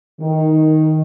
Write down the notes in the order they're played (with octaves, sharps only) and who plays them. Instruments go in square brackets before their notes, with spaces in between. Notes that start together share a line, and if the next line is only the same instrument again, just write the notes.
[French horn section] D#3